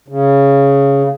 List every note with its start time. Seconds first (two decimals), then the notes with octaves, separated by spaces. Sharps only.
0.08 C#3